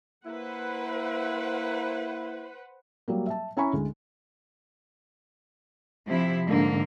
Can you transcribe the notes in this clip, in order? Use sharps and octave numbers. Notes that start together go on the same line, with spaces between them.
A#3 E4 B4 C5 F#5
F#3 G3 A#3
E5 A5
C#4 E4 G#5 A#5 B5 C#6
D2 G#3
C3 F3 E4
G#2 D3 A#3